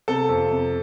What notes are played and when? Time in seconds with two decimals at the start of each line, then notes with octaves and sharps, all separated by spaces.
0.08 C3 A4
0.29 F2
0.51 C3